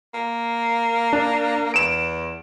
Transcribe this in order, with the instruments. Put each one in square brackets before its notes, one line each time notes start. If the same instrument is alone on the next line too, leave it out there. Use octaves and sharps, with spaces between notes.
[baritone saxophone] A#3
[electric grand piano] D4
[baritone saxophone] E2 [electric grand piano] D7 E7